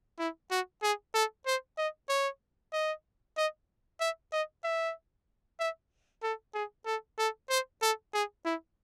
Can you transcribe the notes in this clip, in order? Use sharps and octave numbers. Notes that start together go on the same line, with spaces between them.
E4
F#4
G#4
A4
C5
D#5
C#5
D#5
D#5
E5
D#5
E5
E5
A4
G#4
A4
A4
C5
A4
G#4
E4